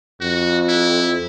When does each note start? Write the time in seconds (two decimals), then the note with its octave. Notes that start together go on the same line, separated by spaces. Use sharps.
0.21 F2 F#4
0.69 E4